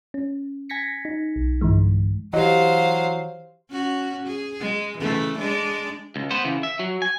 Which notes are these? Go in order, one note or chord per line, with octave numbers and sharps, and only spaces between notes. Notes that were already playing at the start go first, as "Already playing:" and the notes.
C#4
G#5 G#6 A#6 B6 C#7
D#4
B1
G2 D3 E3 G#3
E3 F#3 G4 C5 D#5 F5
C#4 F#4
G#4
G#3
C#3 E3 A3
G#3 D4 D5
C#2
B3 C5
C#3 E3
E5
F#3
G#5